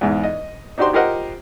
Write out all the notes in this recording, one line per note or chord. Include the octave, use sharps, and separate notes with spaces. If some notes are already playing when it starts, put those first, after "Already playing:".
E2 G#2
D#5
D4 D#4 F#4 G4 C5 C6
F4 G4 A#4 C5 D#5 F#5